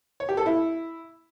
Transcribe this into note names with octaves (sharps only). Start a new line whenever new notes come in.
C#5
G4
A4
E4